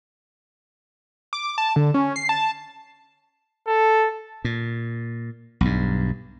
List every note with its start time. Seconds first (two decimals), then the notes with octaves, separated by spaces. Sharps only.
1.33 D6
1.58 A5
1.76 D3
1.94 C#4
2.16 C7
2.29 A5
3.68 A4
4.45 A#2
5.61 B1 G2